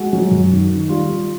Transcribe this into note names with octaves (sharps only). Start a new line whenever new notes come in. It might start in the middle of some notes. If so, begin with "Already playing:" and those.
Already playing: G#3 F#4
F#3
F#2
D#3
D#3
G3 F4
G3